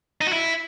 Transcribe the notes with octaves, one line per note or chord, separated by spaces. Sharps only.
D#4
F#4
E4